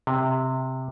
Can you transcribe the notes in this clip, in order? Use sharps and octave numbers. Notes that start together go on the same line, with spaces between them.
C3